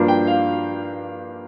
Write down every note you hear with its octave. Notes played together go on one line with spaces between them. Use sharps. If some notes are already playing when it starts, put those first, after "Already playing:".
Already playing: G2 F3 A#3 D4
G5
F5